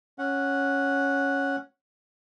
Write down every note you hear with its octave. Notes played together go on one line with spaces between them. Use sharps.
C#4 F#5